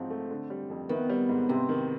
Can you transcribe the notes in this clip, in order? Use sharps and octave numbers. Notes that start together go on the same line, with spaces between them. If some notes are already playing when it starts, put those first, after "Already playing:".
Already playing: G#2 F3 F#3 C4
A3
D3
G3
F2
D#3 B3
G3
G#2
C3 C4
D#3